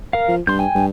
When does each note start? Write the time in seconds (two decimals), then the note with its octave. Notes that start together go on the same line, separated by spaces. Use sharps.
0.13 A#4 F5
0.29 F3
0.47 G2 C6 G6
0.59 G5 G#5
0.75 G2